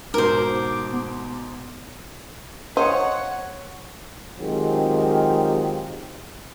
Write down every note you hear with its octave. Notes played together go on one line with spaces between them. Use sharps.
G#2 B2 D#4 A#4 C5 D6
B3
C5 C#5 D#5 F5 F#5
D#3 F#3 G#3 C4 F4 G4